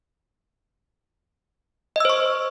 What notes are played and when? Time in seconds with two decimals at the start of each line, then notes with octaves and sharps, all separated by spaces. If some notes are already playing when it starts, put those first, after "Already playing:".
1.96 D#5
2.00 E6
2.05 C5
2.10 C#6